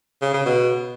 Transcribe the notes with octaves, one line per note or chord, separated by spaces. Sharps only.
C#3
C#3
B2